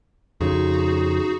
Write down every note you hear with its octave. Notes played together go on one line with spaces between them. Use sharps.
F2 C#3 D#4 F#4 G#4